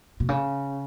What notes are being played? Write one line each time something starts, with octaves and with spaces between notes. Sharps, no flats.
B2
C#3